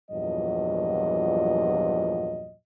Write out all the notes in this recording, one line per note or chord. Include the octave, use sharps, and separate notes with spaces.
E2 G2 A#2 F3 F#3 D#5